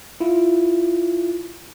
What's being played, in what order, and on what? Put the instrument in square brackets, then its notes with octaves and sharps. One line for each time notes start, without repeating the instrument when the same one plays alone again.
[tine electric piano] E4 F4